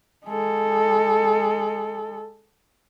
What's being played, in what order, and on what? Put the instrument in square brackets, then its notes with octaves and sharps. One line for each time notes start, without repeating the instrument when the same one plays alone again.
[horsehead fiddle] G#3 A4